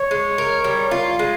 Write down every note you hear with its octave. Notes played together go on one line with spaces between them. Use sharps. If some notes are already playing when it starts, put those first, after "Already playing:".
Already playing: C#5
G#3
A#4
G3
F4
G#3